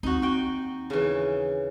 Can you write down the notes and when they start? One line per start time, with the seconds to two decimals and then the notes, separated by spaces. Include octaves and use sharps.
0.03 D#2 C4 D#4 F#4
0.22 F#4 G5
0.90 C#3 E3